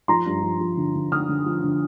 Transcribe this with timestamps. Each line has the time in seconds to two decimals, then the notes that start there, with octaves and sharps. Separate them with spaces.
0.08 F3 A#5 C6
0.26 G2
0.44 F3
0.61 F3
0.77 D3
0.95 D3
1.12 D3 D#6 F6
1.29 D3
1.46 F3
1.64 D3